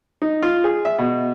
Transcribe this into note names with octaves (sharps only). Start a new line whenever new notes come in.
D#4
F4
G#4
E5
B2